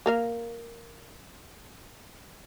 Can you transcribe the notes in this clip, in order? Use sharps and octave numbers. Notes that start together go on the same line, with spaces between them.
A#3 A#4 F5